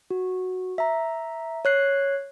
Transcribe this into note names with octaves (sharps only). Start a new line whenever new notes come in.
F#4
E5 A#5
C#5 F#6 C7